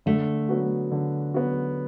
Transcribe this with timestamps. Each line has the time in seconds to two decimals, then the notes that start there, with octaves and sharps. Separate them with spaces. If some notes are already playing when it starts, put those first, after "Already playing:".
0.06 D3 A3
0.49 F#3 B3 F#4
0.92 D3
1.34 F#3 B3 F#4